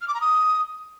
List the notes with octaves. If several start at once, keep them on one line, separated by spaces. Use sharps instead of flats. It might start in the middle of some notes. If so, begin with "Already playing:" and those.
F6
D6
A#5
D#6